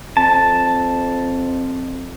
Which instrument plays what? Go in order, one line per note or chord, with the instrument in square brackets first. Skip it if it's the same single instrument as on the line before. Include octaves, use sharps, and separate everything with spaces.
[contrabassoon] F2 [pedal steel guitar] A5